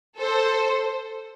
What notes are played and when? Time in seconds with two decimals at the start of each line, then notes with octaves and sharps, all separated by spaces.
0.18 A4 C5